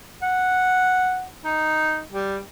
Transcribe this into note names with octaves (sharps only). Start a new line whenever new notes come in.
F#5
D#4
G3